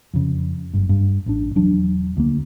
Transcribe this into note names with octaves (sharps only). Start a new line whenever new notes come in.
F2 C#3
F#1 G2
G2
A1 D4
E1 E3 F#3 D4
D2 A#3